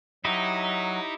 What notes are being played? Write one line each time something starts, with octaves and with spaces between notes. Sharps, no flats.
F#3 D#4 E4 G4 D#5